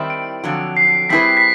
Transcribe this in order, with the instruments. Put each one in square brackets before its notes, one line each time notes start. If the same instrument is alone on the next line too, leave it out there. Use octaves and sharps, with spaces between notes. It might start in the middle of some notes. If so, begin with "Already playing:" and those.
Already playing: [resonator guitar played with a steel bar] D#3 G3 C4 E4
[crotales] D7
[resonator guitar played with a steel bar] F2 D3 F#3
[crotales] C7
[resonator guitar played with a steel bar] G3 C4 E4 G#4 B4 [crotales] B6
[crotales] B6